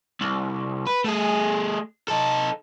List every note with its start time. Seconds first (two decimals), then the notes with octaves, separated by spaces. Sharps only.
0.21 C2
0.87 B4
1.04 A3 G#4
2.08 D#4 A4